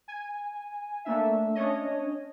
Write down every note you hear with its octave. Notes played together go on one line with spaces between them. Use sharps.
G#5
A3 A#3 D4 E5
C#4 D4 C#5 D#5